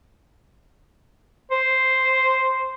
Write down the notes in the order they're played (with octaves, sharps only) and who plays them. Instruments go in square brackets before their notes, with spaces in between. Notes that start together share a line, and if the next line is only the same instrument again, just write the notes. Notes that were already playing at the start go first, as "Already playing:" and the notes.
[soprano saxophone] C5